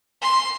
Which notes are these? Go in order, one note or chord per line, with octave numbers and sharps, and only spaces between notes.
C6